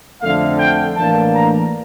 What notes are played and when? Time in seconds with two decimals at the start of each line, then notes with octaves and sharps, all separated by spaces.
0.21 F2 D3 A3 F5
0.59 G5
0.96 A2 E3 A#3 D4 A5
1.33 A#5